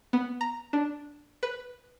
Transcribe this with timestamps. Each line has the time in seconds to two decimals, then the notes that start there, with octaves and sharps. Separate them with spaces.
0.13 B3
0.41 A#5
0.73 D4
1.43 B4